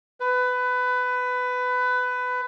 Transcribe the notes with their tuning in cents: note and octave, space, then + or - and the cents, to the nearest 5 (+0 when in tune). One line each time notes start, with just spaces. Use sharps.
B4 +20